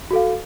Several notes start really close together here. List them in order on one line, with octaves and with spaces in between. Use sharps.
F#4 A4 F5